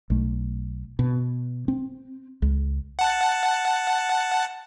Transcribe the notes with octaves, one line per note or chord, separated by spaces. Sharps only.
B1 A3
B2
C4
C#2
F#5 A5